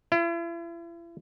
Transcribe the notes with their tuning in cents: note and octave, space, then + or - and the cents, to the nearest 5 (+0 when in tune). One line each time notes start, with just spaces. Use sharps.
E4 +40